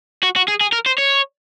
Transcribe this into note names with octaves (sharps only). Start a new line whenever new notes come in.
F#4
F#4
G#4
G#4
A#4
C5
C#5